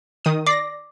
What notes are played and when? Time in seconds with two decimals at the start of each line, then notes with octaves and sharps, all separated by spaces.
0.25 D#3 D#6
0.47 D5 D6 A#6 C7